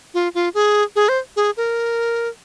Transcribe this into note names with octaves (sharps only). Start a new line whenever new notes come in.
F4
F4
G#4
G#4
C5
G#4
A#4